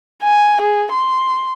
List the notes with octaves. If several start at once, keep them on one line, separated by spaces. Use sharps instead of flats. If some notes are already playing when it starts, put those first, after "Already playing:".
G#5
G#4
C6